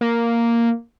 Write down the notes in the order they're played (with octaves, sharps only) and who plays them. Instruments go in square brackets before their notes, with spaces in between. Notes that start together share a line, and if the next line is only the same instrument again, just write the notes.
[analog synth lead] A#3